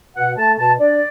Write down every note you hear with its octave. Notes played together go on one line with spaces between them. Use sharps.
B2 F#5
A3 A5
B2 A5
D4 D5